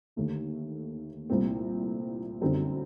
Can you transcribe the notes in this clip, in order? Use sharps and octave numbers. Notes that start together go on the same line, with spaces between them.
D#2 D3 A3
C2 A#2 A3 C4
F#2 D3 G3 C4 D#4